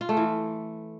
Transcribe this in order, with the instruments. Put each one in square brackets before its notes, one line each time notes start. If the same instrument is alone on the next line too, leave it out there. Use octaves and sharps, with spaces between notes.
[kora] F4
A3
E3